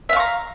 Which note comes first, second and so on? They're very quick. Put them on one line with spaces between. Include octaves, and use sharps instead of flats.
E5 F5 C#6 A#5